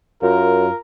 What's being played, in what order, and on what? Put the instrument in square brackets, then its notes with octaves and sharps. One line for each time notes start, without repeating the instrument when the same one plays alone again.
[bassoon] F#2 [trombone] F4 [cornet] A#4